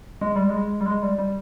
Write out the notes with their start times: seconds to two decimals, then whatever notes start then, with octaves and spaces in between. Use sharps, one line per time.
0.21 G#3
0.36 G3
0.50 G#3
0.81 G3
0.86 G#3
1.03 G3
1.19 G3